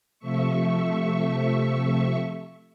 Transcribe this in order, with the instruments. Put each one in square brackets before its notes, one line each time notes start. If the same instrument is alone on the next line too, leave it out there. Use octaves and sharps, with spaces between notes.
[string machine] C3 F3 A3 E5 C#6